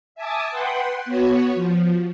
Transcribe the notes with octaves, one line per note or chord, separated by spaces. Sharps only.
E5 G#5 A5 D6 D#6
B4 F#5 G5 C6
B3 F#4 C#5
F3